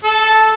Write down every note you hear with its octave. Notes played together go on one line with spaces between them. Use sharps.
A4